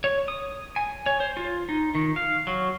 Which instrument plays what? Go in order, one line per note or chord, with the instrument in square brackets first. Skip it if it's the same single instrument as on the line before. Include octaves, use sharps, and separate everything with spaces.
[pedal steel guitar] C#5
D#6
G#5
C#5
C5
F4
D#4
D#3
F5
F#3